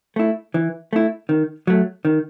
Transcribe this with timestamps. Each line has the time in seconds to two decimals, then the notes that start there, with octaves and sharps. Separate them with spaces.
0.16 A3 E4
0.54 E3
0.93 A3 E4
1.29 D#3
1.67 F#3 A3
2.05 D#3